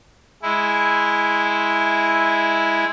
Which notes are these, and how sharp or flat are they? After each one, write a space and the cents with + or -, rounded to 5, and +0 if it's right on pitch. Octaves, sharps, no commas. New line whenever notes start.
G#3 +0 E4 -5